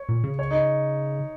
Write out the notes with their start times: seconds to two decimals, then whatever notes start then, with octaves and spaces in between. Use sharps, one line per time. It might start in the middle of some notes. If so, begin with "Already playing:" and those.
Already playing: C#5
0.09 A#2
0.24 C#3
0.39 C#5
0.51 D#4